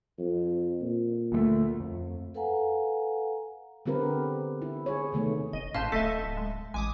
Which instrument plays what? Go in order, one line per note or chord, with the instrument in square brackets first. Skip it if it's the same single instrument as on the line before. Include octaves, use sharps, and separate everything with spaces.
[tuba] F2
A#2
[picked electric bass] D2 G#3 A3
F2
[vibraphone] A4 B4 F5 F#5 G#5 A#5
[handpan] D3 B3 C4 G4 A#4 B4
E4
G#4 C#5
C3 D#3 A3 B3
[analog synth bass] F1 [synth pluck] D#5
[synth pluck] G#1 B4 C6 [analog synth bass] A2 [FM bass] C#4 [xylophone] F5 A5 G6
[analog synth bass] D1 [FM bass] A3 [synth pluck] A4 D#5 E5 [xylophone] B6
[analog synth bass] D1
[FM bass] G#3
[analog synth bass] A1 [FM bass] G#3 [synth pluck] G#5 D6 D#6